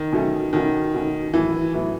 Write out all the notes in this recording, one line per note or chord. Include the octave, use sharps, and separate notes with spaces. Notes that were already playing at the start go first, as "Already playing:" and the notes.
Already playing: D#3
B2 F#3 A3 C#4
B2 D#3 A3 C#4 F#4
B2 A3 C#4 F#4
A2 E3 F#3 B3 E4
A2 F#3 B3 E4